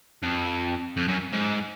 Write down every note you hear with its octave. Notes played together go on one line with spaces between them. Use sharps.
F2
F2
F#2
G#2